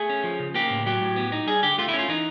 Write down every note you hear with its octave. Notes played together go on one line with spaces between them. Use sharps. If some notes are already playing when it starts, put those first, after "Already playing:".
Already playing: A3 G#4
C#4
F3
C#3
A#3 G4
A2
F#3 G4
A2
B3
D#4
G3 G#4
D3 G4
A3 F4
E4
C#4
F4
E3 D#4